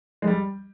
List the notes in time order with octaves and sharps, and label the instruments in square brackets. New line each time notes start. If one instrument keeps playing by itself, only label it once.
[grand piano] G#3
G3